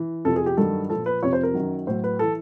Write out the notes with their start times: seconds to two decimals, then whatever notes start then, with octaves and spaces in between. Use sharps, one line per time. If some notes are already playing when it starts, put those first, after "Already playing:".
Already playing: E3
0.25 F2 C3 F3 A4
0.36 G#4
0.46 G4
0.57 G2 D#3 F#3 A4
0.90 A#2 F3 A4
1.06 B4
1.22 F2 C3 F3 C#5
1.33 C5
1.43 A#4
1.54 F#2 D#3 F#3
1.87 A2 F#3 C5
2.04 B4
2.19 E3 A4